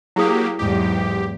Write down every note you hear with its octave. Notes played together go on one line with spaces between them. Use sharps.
F#3 A#3 E4 G4 G#4 D#6
E2 G#2 F#3 G4